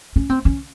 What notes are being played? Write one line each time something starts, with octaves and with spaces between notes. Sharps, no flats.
C#4
C4
C#4